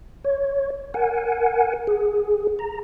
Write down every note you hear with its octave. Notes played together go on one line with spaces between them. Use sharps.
C#5
A#4 F#5 G#5
G#4
A#5